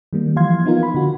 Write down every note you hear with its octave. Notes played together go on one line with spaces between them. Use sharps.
D#3 G3 A#3
E3 F3 F5 C6 G#6
B3 D#4 F4 A#4
B5
D3 F#4